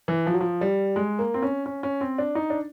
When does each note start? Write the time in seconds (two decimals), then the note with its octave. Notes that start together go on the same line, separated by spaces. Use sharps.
0.08 E3
0.26 F3
0.33 F#3
0.41 F3
0.61 G3
0.96 G#3
1.19 A#3
1.34 C4
1.42 C#4
1.66 C#4
1.83 C#4
2.01 C4
2.18 D4
2.35 D#4
2.50 D4